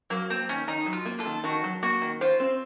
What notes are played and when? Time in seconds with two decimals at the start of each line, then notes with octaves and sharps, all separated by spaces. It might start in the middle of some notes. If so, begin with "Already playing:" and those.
0.10 F#3 A#3
0.30 A#3 C4
0.49 D#3 C#4
0.67 D#3 D#4
0.86 F#3
0.93 F4
1.06 A#3
1.19 F4 A4
1.26 D#3
1.44 D#3 F#4
1.64 F#3
1.83 A#3 F#4
2.02 D#3
2.21 F4 C5
2.40 C4